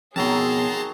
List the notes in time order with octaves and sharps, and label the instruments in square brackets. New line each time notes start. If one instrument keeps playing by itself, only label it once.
[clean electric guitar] F2 B2 [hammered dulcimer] D#3 F#3 [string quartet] G#4 [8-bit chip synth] A5 A#5 C6